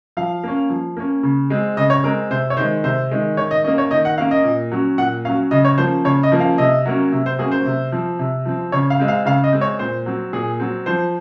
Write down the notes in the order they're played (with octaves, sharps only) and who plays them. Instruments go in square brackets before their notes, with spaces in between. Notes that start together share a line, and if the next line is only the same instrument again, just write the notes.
[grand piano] F3 F5
A#3 C#4
F3
A#3 C#4
C#3
G#3 C4
C#3 D#5
C#5
G#3 C4 A#4
C3 C5
C#5
D#3 G#3 C5
C3 C5
D#3 G#3
D#3 C#5
D#5
C#4 D#5
A#3
C#5
D#3 D#5
F#5
A#3 C#4 F5
D#5
A#2
F#3 C#4
A#2 F#5
F#3 C#4 F5
C#3 D#5
C#5
F3 A#3 C#4 C5
C#3 C#5
D#5
F3 A#3 C#4
F5
C3 D#5
F#3 A#3 C#4
C3
C5
F#3 A#3 C#4 G#4
C5
C3
F3 C4
C3
F3 C4
C#3 C#5
F5
G#3 C4
F5
C#3 F5
D#5
G#3 C4
C#5
A#2 C5
F#3 C4
A#2 G#4
F#3 C4
F3 C5